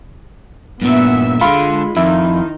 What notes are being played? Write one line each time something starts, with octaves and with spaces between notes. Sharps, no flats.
G2 A#2 B3 E5
D3 G#3 F4 B5 C6
F2 D#3 D#4 E4